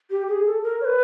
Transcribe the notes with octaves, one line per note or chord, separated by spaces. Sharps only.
G4
G#4
A4
A#4
C#5
B4